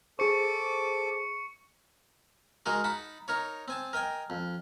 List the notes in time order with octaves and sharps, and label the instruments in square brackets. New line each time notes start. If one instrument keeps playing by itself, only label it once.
[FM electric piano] G#4 C5 [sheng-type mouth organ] A4 D6 [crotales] C#6 C#7
[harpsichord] D#3 G#3 F#4 G#4 A#4
D#4 F#5 A5 B5
D#4 A#4 C#5
C4 G#5 A5
A#4 D#5 G5 G#5
F2